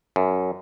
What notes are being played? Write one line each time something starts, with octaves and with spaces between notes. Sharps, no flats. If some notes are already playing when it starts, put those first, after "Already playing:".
F#2